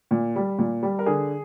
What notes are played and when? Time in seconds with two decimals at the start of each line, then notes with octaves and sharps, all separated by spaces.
0.11 A#2
0.36 G3
0.58 A#2
0.83 G3
0.99 A#4
1.06 D3 G#4